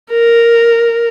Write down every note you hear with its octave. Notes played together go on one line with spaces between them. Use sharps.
A#4